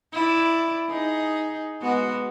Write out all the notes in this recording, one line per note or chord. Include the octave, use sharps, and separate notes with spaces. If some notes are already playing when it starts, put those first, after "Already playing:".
E4 D5
D#4 G#4
G#3 B3 F#4